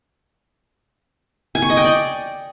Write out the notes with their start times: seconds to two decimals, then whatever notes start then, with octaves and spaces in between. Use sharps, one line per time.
1.55 G#5
1.62 C#6
1.70 D#5
1.77 G5
1.84 D5